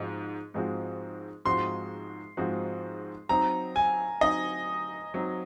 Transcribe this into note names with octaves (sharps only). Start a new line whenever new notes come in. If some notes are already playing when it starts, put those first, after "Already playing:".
Already playing: G#2 F3 G#3 C4 F#4
G#2 F3 G#3 C4 F#4
G#2 F3 G#3 C4 F#4 C6
G#2 F3 G#3 C4 F#4
F#3 C4 D#4 A#5
G#5
F#3 C4 D#4 D#5
F#3 C4 D#4